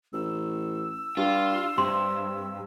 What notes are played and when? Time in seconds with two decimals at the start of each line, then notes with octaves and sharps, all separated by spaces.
0.13 A1 E6
1.17 G2 F4
1.78 G2 C3 C6